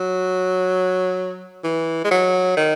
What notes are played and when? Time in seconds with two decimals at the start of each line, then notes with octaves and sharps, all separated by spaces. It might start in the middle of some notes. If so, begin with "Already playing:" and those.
Already playing: F#3
1.63 E3
2.04 G#3
2.11 F#3
2.56 D#3